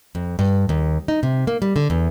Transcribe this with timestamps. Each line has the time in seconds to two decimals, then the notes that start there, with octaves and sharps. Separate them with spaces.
0.15 F2
0.39 G2
0.69 D#2
1.08 D#4
1.23 C3
1.47 A#3
1.62 G3
1.76 D3
1.90 E2